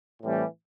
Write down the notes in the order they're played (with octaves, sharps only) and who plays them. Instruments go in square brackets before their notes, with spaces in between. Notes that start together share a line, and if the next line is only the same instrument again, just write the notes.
[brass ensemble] A2 E3 G3 C4